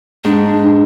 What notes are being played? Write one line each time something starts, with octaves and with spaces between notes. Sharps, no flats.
G#2 D4